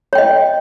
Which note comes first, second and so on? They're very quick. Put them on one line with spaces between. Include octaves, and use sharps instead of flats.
C#5 G5 D#5